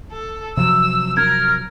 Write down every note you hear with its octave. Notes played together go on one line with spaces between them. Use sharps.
A4
C3 F3 F#3 E6
A#4 F6 G#6